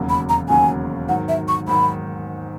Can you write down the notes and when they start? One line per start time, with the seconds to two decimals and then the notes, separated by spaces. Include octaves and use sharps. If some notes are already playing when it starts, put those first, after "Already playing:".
Already playing: E1 D#2 C#3 F#3
0.09 B5
0.29 A#5
0.49 E1 D#2 C#3 F#3 G#5
1.09 G#2 D#3 F#3 F#5
1.29 E5
1.48 C#6
1.67 G#2 D#3 F#3 B5